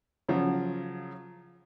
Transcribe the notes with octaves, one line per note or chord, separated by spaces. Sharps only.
C#3 F3 F#3